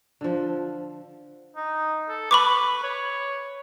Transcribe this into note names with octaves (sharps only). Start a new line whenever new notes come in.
D3 F3
D#4
A4
B4 B5 C#6 D6
C#5